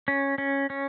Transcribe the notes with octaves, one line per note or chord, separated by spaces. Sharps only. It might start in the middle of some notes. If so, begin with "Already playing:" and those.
C#4
C#4
C#4